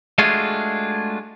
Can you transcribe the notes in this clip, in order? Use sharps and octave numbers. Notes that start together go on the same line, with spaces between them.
G#3 A3 D4 F4 F#4 G#4